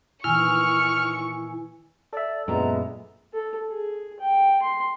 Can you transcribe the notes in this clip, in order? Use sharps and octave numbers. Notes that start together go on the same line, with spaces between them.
A#2 D#3 E3 E4 G#5 C#6 F6
A4 D5 E5
F#2 A#2 D3 G#3 B3 A#5
A4
G#4
G5
C6